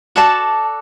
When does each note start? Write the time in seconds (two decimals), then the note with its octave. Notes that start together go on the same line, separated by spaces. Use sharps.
0.16 F#4 A4 D5 A5